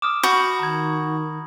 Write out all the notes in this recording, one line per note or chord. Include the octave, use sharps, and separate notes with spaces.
D6 D#6 F6 E7
F#4 B5 G6 F#7
D#3 A#5 G#6